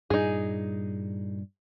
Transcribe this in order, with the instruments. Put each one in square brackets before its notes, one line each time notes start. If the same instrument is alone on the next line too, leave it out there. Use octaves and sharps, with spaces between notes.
[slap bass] G2 A#2 G3 [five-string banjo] D#4 G#4